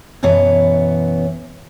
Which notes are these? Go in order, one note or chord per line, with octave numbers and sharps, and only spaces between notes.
F#2 B2 E3 B3 C#5